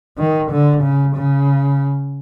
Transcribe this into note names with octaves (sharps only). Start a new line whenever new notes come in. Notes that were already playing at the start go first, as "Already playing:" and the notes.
D#3
D3
C#3
C#3